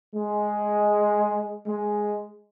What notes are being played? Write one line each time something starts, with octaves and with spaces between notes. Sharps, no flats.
G#3
G#3